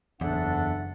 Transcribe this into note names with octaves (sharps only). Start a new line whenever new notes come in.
F#1 E2 D4 A4 E5 F#5